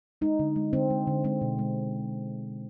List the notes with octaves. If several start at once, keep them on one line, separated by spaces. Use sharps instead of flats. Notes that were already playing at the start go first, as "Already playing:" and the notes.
G#3 D#4
D3
G#3
D3 C4
G#3
D3
G#3 C4
B2
G#3